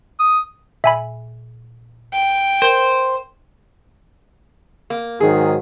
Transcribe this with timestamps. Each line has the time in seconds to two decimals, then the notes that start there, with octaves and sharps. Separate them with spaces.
0.19 D#6
0.84 A#2 E5 G#5 B5
2.13 G5
2.62 A#4 C5
4.90 A#3
5.20 G#2 D#3 F#3 G#4